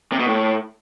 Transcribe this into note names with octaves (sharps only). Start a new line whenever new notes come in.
C3
B2
A2